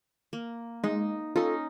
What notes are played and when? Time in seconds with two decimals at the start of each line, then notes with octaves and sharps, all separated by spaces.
0.33 A#3
0.84 G#3 D#4
1.36 C#4 D#4 F4 A4